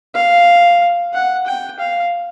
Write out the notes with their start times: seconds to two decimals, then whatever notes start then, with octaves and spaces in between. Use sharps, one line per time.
0.14 F5
1.13 F#5
1.46 G5
1.79 F5